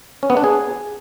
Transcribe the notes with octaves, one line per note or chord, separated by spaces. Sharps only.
C#4
B3
D4
G#4